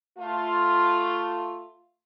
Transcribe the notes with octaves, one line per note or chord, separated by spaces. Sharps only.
A3 F4